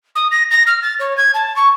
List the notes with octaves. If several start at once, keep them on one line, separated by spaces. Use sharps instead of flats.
D#6
A#6
A#6
F6
A6
C#5
G#6
A5
C#6